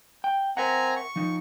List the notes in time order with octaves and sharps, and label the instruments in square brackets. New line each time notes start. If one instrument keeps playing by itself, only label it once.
[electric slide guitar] G5
[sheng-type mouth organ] C4 G#5 A#5 [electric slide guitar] A#4 E5 F#5
[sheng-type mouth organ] C#6
[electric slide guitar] F3 D#4